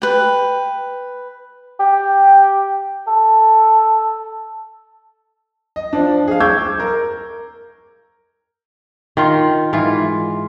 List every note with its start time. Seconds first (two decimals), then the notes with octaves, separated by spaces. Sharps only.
0.02 B4 G5
1.80 G4
3.07 A4
5.76 D#5
5.93 F3 D4
6.28 G#4 F5
6.40 C#6 D6 E6 G6 G#6
6.80 A#4
9.17 D#3 F4 F5
9.73 G#2 E3 F4